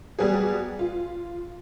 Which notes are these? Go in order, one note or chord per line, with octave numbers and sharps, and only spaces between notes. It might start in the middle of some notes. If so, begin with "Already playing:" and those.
F#3 G3 B3 F#4 G#4
F4